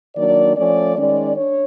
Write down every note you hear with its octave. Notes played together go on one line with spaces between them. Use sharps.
D#3 F#3 A#3 D4 D5
F3 A3 C#4 D5
D#3 G#3 C#4 D5
D4 C#5